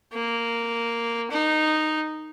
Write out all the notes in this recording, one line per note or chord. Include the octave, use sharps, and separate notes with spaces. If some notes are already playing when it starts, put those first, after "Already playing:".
A#3
D#4